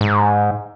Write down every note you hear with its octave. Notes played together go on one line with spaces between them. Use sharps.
G#2